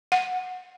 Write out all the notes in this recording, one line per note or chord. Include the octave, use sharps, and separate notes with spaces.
F#5